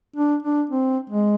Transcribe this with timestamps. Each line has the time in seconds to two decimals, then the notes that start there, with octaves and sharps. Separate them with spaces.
0.16 D4
0.43 D4
0.70 C4
1.10 G#3